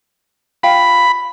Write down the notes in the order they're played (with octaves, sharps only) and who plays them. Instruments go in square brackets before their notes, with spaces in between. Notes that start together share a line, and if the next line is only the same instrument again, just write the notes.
[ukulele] F4 F5 G5 [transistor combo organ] B5